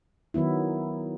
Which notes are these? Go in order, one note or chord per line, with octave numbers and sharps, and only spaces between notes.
D#3 F#3 B3 E4